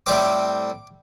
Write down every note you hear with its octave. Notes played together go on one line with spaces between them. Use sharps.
A2 G3 C4 D6